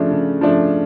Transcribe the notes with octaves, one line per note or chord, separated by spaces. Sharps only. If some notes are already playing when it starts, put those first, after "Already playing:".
Already playing: C#3 F3 A3 D4
C#3
F3 A3 D4